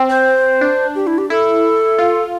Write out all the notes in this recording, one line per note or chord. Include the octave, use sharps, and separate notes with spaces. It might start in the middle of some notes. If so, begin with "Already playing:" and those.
Already playing: C4
C5
D4
G4
E4
G4
E4 A4
F4